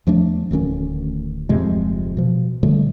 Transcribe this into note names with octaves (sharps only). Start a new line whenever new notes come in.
E2 F3 A3 D4
D1 D2 D#3 C#4
D1 F2 C3 G#3
B2 F3
A#2 D3 G3 A3